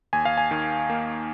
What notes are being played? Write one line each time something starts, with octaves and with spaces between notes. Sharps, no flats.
D#2 G#5
F5
G#5
D#3
A#3